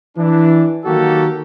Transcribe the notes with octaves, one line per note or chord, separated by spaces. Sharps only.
E3 D4
D#3 F#3 A#3 F#4 G4 A4